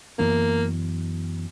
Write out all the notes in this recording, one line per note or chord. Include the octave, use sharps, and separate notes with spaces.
F#2 E3 A#3 B3